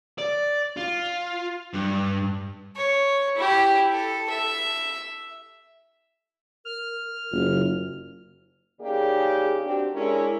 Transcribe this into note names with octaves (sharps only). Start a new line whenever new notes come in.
D5
F4
G2
C#5
E4 G4
A4
E5
A#4 F6
F#1 F4
C#3 A#3 D#4 G4 G#4 D5
C4 D4 F#4 G4
G#3 C#4 D4 E4 A#4